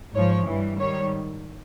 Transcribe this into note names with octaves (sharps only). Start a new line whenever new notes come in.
G#2 F3 C#5
G2 E3 G3
G#2 D#3 G3 C#5